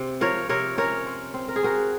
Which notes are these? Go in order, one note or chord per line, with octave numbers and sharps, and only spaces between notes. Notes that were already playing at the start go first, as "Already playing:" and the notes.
Already playing: C3 C4
F3 A#4 C#5
C3 A#4 C#5
C#4 A#4 C#5
C4
C4
A#4
G#4
C4 F#4 A#4